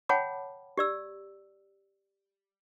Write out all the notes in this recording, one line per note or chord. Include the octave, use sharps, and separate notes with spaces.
C#5 F#5 G5 A5 B5 D6
G4 D5 E6